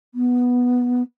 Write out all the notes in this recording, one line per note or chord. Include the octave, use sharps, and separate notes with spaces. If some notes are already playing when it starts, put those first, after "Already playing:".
B3